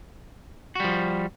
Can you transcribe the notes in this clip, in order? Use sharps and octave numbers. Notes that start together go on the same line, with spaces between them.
F3 G3 F#4